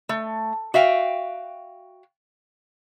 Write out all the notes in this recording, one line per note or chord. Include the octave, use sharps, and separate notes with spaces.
A3
F#4 E5 F5 G5